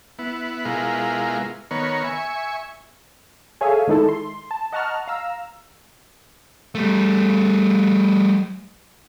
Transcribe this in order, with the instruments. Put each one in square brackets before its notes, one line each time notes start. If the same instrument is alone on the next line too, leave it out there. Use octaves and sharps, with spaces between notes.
[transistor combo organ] B3 E4
B2 G#3 E4 F4 A#4
D#3 B3 A#4 C#5
E5 G#5 C#6
[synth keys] G#4 A4 C#5 E5 F5 G#5
D#3 G#3 D#4 E4 A4
C6
A5
D#5 F#5 A5 A#5 C#6 F6
F5 A#5 E6
[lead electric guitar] G3 A3